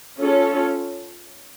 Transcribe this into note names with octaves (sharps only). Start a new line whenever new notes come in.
C#4 F4 A4